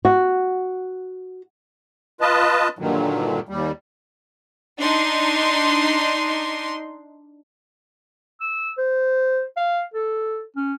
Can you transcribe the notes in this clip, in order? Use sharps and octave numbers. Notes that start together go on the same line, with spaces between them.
F#4
F4 B4 D#5 A5
G2 A#2 D3 D#3 F#3
D#2 G3
D4 D#4 C6
E6
C5
F5
A4
C#4